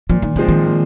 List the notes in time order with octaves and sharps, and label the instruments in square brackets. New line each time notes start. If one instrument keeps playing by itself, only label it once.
[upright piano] A#2 [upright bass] F3
[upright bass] D#3
[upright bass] C#3 [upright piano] F3 G#3 C4
[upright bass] D#3
[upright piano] A#2